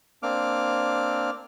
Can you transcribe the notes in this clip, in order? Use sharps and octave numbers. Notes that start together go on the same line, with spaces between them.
A#3 C4 D4 D6 F6